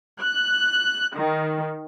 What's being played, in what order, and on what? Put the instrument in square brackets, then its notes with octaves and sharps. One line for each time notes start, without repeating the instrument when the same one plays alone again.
[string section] F#6
D#3